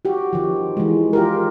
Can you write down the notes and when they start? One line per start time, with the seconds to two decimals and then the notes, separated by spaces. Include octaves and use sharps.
0.05 F#4 G4
0.33 D#3 F3
0.77 E3 G#3
1.13 F4 G4 A#4